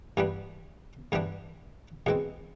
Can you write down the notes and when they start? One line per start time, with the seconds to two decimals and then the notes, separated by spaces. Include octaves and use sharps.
0.17 G2 E3 G3 B3 D4
1.12 G2 E3 G3 B3 D4
2.06 E2 B2 G#3 C4